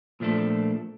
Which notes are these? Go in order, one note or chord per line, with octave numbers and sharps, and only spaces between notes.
A#2 F3 A3 D4 A4